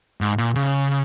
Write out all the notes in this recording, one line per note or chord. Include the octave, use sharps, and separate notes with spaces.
G#2
A#2
C#3